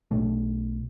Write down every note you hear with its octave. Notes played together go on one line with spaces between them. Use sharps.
B1 B2 A3 D4